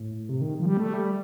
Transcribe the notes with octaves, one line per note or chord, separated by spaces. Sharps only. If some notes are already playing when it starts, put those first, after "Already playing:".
Already playing: A2
C3
D#3
F3
G3
A3
G3